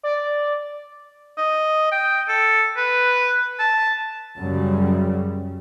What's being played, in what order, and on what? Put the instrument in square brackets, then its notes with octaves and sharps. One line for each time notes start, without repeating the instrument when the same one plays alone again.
[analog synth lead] D5
[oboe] D#5
G5
A4
B4
A5
[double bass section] F#2 C#3 G3